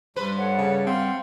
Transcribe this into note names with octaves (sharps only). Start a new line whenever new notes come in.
G2 B4 C5
A4 C#5 F#5
C#3
C4 F5 F#5 C6